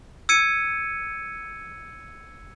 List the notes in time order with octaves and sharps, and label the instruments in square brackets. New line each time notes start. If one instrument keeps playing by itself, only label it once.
[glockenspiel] E6 G#6 C#7 D#7